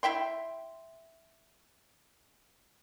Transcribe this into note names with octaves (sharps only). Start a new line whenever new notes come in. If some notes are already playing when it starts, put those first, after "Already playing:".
E4 E5 G5 C6